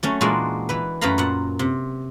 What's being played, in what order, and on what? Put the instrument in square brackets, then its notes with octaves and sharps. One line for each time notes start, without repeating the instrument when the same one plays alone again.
[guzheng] F#3 A3 C#4
A#2 E3 G#3 A#3 D4 F#4
E3 B4
F#2 A3 B4 F5 A#5 B5
A#2 F#5
C3